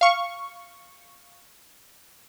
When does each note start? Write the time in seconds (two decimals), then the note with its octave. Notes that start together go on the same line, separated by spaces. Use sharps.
0.01 F5 C#6